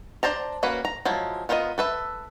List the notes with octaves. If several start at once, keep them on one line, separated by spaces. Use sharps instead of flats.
D4 C5 A5 A#5
A#3 C#4 F#4 B4
A#5
F3 F#3 G#3 E4
B3 F4 A#4 C5 D#5
A4 B4 E5